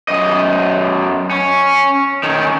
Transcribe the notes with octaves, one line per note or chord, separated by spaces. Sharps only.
F#2 D#5
C#4
D#3 C#4